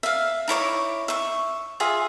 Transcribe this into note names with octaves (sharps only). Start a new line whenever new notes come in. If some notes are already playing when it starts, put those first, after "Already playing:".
E5 F5
D#4 E4 C#5 D6
E5 C#6
F4 G#4 E5